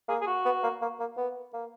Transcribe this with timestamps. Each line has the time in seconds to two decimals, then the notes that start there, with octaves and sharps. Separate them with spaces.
0.08 A#3 G#4
0.21 G#4
0.27 F#4
0.45 B3
0.63 A#3
0.82 A#3
1.00 A#3
1.17 B3
1.53 A#3